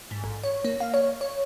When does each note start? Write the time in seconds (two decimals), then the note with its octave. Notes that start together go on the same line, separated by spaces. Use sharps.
0.11 G#2
0.24 A1
0.44 C#5
0.65 A#3
0.80 F5
0.94 C#5
1.21 C#5